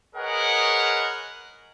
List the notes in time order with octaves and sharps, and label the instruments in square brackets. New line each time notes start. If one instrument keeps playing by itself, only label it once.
[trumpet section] G#4 A#4 B4 C#5 D#5 F#5